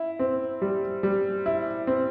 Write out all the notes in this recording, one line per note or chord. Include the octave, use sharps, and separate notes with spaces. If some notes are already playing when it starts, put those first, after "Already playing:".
Already playing: E4
C4
G3
G3
E4
C4